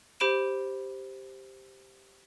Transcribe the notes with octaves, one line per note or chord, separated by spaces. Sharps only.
G4 C5 B5 D7 E7